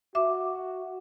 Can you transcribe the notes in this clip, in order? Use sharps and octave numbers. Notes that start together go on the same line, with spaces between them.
F#4 E5 D6